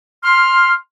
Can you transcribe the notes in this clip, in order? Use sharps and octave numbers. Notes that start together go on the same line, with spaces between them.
C6 F6